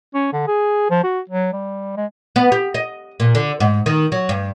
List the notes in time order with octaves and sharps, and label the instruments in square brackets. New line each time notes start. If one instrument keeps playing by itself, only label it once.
[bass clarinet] C#4
D3
G#4
F3
F#4
F#3
G3
G#3
[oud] B3
G4
D#5
A#2
D3
G#2
D#3
F#3
G2